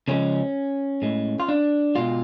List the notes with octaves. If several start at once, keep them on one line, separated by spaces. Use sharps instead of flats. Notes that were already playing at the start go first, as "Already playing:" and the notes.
C#3 F3 G#3 C#4
A2 G#3
F4
D4
B2 G#3 F4